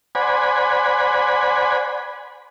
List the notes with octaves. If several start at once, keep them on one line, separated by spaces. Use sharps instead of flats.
C5 D5 F#5 G#5 B5